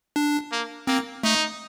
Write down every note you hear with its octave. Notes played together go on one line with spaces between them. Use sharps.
D4
A#3
A#3 C4
A3 D#4